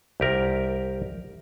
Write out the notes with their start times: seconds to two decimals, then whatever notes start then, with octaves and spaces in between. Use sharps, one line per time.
0.20 C2 G4 A#4